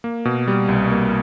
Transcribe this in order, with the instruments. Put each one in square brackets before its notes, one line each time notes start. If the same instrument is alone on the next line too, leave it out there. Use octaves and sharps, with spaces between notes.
[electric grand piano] A#3
B2
G3
C2
A#3